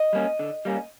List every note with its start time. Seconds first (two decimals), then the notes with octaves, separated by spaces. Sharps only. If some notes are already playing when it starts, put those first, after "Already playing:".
Already playing: D#5
0.13 G3 A#3 C#4
0.39 D3
0.65 G3 A#3 C#4